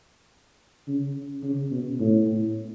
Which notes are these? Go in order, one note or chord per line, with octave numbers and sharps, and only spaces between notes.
C#3
C#3
B2
A2